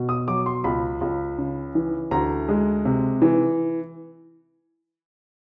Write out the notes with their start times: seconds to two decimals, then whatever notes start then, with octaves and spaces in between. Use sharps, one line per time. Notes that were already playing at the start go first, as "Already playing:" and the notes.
Already playing: B2
0.09 D#6
0.28 F#3 D6
0.46 C6
0.64 C#2 B5
1.01 C#2
1.38 C#3
1.75 E3
2.11 D2 A#5
2.49 G#3
2.85 C3
3.22 E3